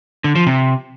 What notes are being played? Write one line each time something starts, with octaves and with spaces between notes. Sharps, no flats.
D3
F3
C3